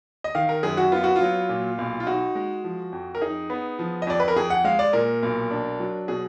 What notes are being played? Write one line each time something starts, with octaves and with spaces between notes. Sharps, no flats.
D#5
D#3 F5
A#4
F#2 G#4
F#4
B3 F4
F#4
F4
F#3
A#2
B1
F4
D#4 F#4
G#3
F3
F2
A#4
D#4 G#4
B3
F3
D#5
F2 D5
B4
A#4
F2 G#4
F#5
G#3 F5
D5
A#2 A#4
B1
D4
F#3
B2 G#4